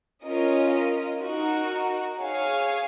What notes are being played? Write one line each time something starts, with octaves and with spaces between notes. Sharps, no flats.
C#4 F4 A#4 D#5
D#4 F#4 A#4
G#4 C#5 F5 G#5